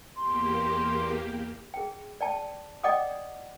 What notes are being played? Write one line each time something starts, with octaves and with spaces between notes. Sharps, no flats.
E2 A#3 G4 C6
G#4 G5
D5 G5 A5
D5 D#5 F#5 G5 D6 D#6